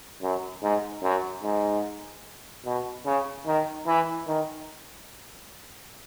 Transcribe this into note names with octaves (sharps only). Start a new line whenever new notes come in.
F#2
G#2
F#2
G#2
B2
C#3
D#3
E3
D#3